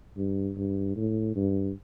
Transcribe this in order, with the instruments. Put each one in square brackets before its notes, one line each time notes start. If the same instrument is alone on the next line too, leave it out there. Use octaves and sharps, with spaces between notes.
[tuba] G2
G2
A2
G2